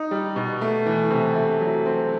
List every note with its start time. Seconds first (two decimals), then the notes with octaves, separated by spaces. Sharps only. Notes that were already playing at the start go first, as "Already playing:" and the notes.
Already playing: D#4
0.11 G3
0.36 B2
0.61 A3
0.86 E3
1.11 C3
1.35 A3
1.61 F#3
1.86 C4